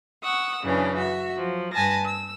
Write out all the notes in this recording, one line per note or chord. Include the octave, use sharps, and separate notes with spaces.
F#5 C#6 D#6 E6
F#2 C#3 E3 C#4 D4
F#4 E5
F3 F#3
G2 B4 G#5 A5 A#6
E6